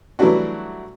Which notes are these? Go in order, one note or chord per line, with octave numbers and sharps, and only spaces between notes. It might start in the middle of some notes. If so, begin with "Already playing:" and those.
E3 F#3 G3 A3 D4 F#4